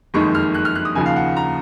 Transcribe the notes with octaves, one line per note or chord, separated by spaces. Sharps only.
F#1 F2 D#3 G#3 C#6
F6
F#6
F6
F#6
D#6
D#2 C#3 F3 G#5
F5
F#5
A#5